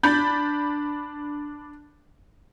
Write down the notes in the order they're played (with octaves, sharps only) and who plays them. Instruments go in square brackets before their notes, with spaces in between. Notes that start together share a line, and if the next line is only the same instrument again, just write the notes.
[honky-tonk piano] D4 B5 G6 A6